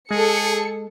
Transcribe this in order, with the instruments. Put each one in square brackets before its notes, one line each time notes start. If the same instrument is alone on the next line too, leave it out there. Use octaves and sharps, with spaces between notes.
[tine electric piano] G#3 [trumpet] G#4 [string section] A4 C#7